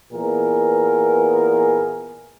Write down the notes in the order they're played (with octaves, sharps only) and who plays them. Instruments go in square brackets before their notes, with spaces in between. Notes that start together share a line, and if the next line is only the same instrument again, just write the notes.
[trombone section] A#2 E3 B3 G#4 A#4